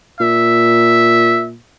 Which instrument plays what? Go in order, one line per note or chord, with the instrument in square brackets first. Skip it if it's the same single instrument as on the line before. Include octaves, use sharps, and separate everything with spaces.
[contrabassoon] A#2 [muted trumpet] E5